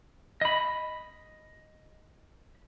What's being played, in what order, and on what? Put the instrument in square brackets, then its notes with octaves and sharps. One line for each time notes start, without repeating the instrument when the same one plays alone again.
[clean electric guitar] D#5 B5